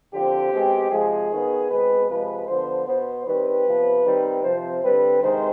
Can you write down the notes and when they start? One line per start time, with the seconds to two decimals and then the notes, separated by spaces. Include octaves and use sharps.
0.13 D3 F3 C4 G4
0.53 B2 G#3 C4
0.91 C3 F3 G#3 G#4
1.31 D#3 B3
1.70 B2 G#3 C4 B4
2.09 C3 F3 G#3 B4
2.48 D3 F3 B3 C5
2.87 B2 B3 C5
3.26 D#3 G3 C4 B4
3.66 C3 F3 B3
4.05 D#3 G3 C4
4.44 C3 F3 C4 C5
4.83 D3 G3 C4 B4
5.22 C3 D#3 G#3 C5